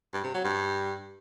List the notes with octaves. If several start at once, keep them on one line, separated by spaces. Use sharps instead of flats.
G2
C3
F#3
G2